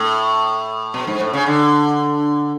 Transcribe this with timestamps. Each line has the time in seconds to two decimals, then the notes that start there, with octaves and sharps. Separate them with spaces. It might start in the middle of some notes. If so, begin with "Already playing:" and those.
Already playing: A2
0.94 B2
1.07 G#2
1.20 A2
1.33 C#3
1.46 D3